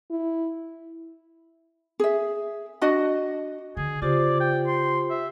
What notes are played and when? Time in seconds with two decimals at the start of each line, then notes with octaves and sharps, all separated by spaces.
0.11 E4
2.00 G#4 E5
2.82 D4 F#4 D#5
3.77 D3 D#3 G#4
4.02 C#3 C#4 F4 G4 C5 D5
4.40 G5
4.67 C6
5.10 E5